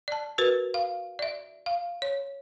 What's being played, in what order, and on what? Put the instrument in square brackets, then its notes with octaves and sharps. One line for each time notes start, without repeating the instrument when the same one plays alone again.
[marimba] D5 A5
F#4 A#4 B4
F5
D5 E5
F5
C#5